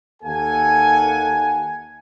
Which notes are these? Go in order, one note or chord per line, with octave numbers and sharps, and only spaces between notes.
D#2 A#3 A4 F#5 G#5